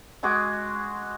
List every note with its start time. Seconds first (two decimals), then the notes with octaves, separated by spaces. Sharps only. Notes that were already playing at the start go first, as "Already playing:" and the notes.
0.23 G#3 F#4 G#4 D6